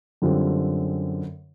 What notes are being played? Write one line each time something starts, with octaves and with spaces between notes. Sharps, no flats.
F#2 D3 G3 C4 F4